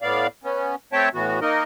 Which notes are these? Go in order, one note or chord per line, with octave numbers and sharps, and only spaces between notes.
A2 B3 D5 F5
B3 C#4
A3 C4 C#5 E5 G5 A5
A2 E3 B3 F#4
A#3 D#4 A#4 D#5